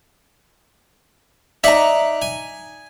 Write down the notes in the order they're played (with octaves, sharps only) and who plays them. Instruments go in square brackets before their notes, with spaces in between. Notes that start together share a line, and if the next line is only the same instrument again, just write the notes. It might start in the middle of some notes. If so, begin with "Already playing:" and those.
[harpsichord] D#4 D5 F#5 [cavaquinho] E5 A#5
[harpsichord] G#5